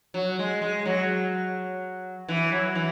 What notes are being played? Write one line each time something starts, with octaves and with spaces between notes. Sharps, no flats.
F#3
G#3
G#3
F#3
E3
F#3
E3